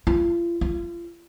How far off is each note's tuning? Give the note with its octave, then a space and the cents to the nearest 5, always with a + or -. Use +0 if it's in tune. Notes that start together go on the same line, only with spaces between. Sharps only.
F4 -40
F4 -35